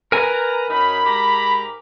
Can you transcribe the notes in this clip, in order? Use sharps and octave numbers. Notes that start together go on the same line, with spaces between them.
A#4 B4 G#5 A#5
F#2 D#4 B5
G#2 G4 A#5